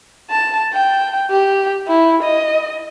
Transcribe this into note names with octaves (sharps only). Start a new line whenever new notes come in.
A5
G5
G4
E4
D#5